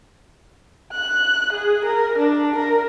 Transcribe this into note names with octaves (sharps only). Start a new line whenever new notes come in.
F#6
G#4
A#4
D4
A#4